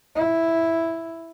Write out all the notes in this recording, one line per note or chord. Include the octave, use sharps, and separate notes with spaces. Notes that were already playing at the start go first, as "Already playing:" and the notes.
E4